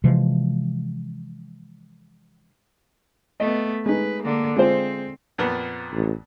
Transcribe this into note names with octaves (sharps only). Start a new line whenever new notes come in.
C3 E3 F3 G#3
A3 B3 D#5
G#3 D#4 B4
D3 A#3
G#3 C4 F4 C5
F2 A#2 B3
A1